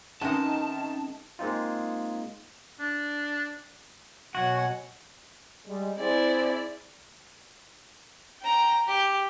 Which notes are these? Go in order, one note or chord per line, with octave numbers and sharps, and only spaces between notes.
D#3 G#3 C4 C#4 D#4 E5 A5
G#3 A#3 C4 D#4 F4
D4
B2 F#3 F#4 F#5 G#5
G3 G#3
C4 E4 G#4 D5
G5 A#5
G4